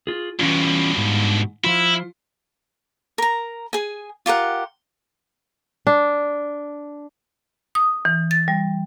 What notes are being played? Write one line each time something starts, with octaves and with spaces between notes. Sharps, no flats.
F4 G#4
G2 B2 E3 C#4 F4
G#2
F3 E4 F4
A#4 A#5
G#4 G#5
F4 G4 A#4 F#5
D4
D#6
E3
A6
G3